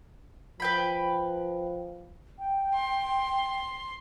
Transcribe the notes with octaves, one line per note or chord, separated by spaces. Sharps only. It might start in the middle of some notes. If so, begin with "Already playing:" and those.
F3 B4 G5 B5
G5
C6